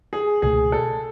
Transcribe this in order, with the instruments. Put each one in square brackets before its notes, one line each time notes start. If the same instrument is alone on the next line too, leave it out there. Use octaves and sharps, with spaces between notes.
[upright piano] G#4
[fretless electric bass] C#2 B2 A3 [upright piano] G#4
[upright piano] A4